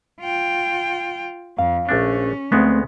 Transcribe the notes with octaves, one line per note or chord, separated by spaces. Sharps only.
F4 G5
F2 F5
A#1 A3 C#4 D4
D2 G#3 A3 B3 C4